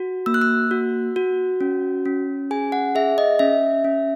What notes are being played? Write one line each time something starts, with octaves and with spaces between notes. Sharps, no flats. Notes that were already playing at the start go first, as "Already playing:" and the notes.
Already playing: F#4
A#3 E6
F#6
E6
F#4
F#4
C#4
C#4
G#4 G#5
F#5
G#4 E5
D#5
C#4 E5
C#4